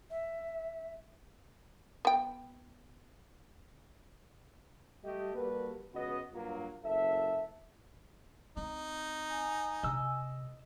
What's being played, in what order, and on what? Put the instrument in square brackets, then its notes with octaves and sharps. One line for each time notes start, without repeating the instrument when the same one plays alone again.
[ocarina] E5
[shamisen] B3 G5
[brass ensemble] G3 A3 G4 D#5
G3 A#3 F#4 A4 B4
C#2 B3 F#4 D#5
G2 F#3 A#3 F4
F#1 A4 E5
[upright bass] C4 [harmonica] D#4
[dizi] G#5
[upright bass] C3 [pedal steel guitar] D#5 E6